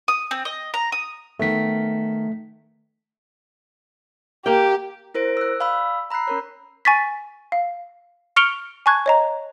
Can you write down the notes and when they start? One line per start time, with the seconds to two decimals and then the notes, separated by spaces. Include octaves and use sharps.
0.08 D#6
0.31 C4
0.45 D#5
0.74 A#5
0.92 D#6
1.39 D#3 A3 B3 B6
4.46 A#3 G4 G5
5.14 E4 A#4 C5 A#6 D7
5.37 E6 F#6
5.60 D5 F5 B5 E6
6.10 A#5 B5 E6 F#6 C7
6.27 C#4 A#4 C#5
6.85 G#5 C#6 A6 B6
7.52 F5
8.36 C#6 F6 C#7 D7 F7 G7
8.86 G#5 A5 C#6 F#6 G#6
9.06 C#5 D#5 A#5